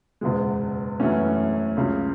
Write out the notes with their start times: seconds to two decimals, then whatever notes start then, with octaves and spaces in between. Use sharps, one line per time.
0.21 F#1 E2 B2 G#3
1.00 F#2 E3 A3 C#4
1.77 C#2 C#3 F#3